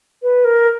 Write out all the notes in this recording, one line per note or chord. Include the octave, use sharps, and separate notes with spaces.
B4
A#4